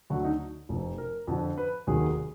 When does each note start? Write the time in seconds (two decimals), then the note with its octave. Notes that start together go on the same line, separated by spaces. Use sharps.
0.10 D2 D3 F#3 F#4
0.24 D#4
0.69 F1 F2 F3
0.98 A#4
1.28 F2 D3 F3
1.57 B4
1.87 F1 D#2 D#3 F#3 G#4